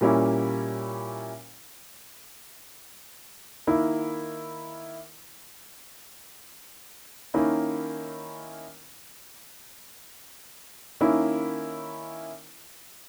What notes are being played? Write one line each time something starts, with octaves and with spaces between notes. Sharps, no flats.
A#2 G3 A#3 C#4 E4
D#3 A#3 E4
D#3 A#3 C#4 E4
D#3 A#3 C#4 E4